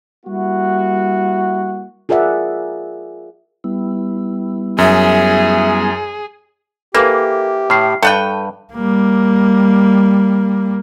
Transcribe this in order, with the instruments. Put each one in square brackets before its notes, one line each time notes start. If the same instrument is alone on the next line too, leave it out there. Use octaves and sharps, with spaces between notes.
[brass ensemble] G3 A#3 E4 F#4
[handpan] F4 G#4 A#4 D5 E5 F#5
[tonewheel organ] G3 B3 E4
[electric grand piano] F#2 [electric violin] G#4 [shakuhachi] E5
[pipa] E3 [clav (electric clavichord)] A#3 [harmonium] G4 [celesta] A4 A#4 F5
[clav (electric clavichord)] A2 [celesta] F6 C7
[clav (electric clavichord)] G2 [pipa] A4 F#5 G5 [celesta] G6 D#7
[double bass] G3 A#3